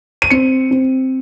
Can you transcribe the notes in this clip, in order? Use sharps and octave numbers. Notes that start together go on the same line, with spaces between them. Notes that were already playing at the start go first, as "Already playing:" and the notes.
D#7
C4 C#7
C4